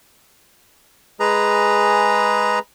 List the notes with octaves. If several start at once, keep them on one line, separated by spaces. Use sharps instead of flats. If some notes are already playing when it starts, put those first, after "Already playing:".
G#3 G#4 B4 A#5